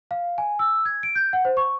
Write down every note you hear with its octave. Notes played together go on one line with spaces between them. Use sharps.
F5
G#5
E6
G#6
D7
G6
F#5
C5
C#6